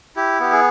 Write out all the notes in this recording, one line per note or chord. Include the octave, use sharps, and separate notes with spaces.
E4 G4
B3 G4
G#4